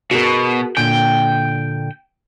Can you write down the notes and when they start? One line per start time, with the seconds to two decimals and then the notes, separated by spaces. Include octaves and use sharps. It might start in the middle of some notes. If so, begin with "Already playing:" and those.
0.11 B2 F#4 G#4 A#4
0.77 A#2 D3 G5 G#5